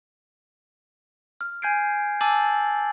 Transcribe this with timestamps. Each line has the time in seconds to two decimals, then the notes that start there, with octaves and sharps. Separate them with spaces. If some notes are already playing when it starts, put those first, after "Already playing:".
1.41 F6
1.62 G#5 G6 G#6 C7 D7
2.21 G#5 A5 D6 E6 A6 F#7